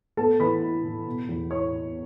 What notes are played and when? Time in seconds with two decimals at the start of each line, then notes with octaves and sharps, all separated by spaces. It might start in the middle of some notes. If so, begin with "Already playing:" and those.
0.17 B3 A4 A5
0.40 E3 B4 B5
0.62 E4
0.84 E3
1.06 B2
1.29 E2
1.50 E4 C#5 C#6
1.73 E4